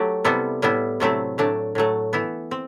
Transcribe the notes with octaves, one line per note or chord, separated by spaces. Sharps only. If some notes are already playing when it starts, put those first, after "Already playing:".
Already playing: F#3 A3 G4
C3 G3 B3 E4 A4
A2 G3 B3 E4
C3 F#3 A3 C4 E4
A2 F#3 A3 D4
A2 F#3 A3
E3 B3 E4
C4